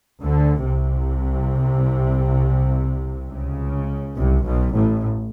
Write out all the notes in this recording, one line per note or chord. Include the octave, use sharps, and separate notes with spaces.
D2 D3
C2 C3
C#2 C#3
C2 C3
B1 B2
A1 A2